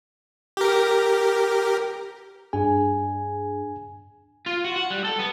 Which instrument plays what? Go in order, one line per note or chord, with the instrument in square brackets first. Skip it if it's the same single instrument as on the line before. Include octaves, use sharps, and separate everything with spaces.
[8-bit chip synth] G4 A#4
[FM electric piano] G2 D4 G#4 [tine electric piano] G#5
[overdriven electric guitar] F4
F#4
F#5
G3
A4
B3